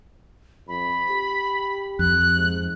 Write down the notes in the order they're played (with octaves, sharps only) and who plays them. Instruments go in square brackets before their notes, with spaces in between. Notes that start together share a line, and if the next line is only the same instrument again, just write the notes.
[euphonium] F2 [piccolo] B5
[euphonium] G4
[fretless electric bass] F2 [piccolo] F#6
[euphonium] G#2